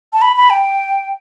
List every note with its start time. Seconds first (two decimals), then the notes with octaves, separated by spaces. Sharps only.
0.13 A5
0.22 B5
0.36 B5
0.50 G5